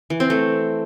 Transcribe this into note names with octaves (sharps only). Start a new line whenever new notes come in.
E3
C4
A3